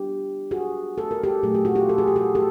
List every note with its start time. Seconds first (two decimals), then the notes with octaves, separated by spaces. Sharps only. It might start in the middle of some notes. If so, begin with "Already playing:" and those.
Already playing: G3 B3 D4 F4 G4
0.51 F#4 G#4
0.98 A4
1.11 A#4
1.24 G4 A4
1.43 A#2 F#3 A3 G#4
1.55 G4
1.65 F#4
1.75 F4 G4
1.89 A4
1.98 G#4
2.07 G4
2.16 F#4 G#4
2.35 G4 A4